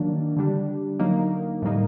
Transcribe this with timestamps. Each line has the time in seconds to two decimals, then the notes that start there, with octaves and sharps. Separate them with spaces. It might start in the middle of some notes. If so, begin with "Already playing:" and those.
Already playing: D#3 F#3 A#3 D4
0.37 D3 G3 D4
0.99 D3 F#3 A#3 D#4
1.62 A2 G3 A#3 D#4